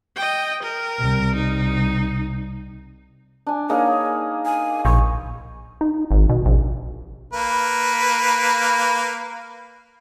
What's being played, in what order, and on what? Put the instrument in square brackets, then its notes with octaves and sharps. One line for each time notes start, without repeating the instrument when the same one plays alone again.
[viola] D#5 G5
A#4
[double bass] C2
[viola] D#4
[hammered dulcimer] D4 G#5
[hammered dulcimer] A#3 D#4 G#4 [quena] C#5
[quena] G#5
[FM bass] A#1 [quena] C#6
[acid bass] D#4
G#1
B2
A#1
[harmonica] A#3 B4